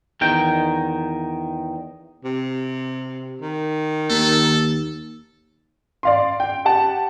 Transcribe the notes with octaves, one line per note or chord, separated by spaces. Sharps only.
E2 D#3 G5
C3
D#3
D#2 A4
D5 F5 C6
G5
G4 F#5 A5